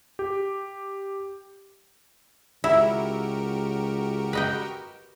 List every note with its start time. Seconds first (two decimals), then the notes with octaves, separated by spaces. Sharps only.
0.19 G4
2.64 C#2 E4 F#4 G4 A#4
4.33 B4 D#5 G5